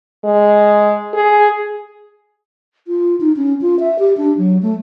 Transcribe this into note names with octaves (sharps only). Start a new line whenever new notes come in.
G#3
G#4
F4
D#4
C#4
F4
E5
G4
D4
F#3
A3